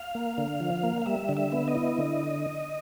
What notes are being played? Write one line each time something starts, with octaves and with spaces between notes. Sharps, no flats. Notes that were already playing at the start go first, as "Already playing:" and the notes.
Already playing: F5
A#3
D3
F3
A#3
F5
G3 E5
D3
E5
B3
D#5
E4
D3